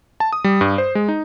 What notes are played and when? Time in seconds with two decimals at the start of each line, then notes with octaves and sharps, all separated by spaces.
0.20 A5
0.33 D#6
0.44 G3
0.61 G2
0.78 C5
0.95 G#3
1.08 D#4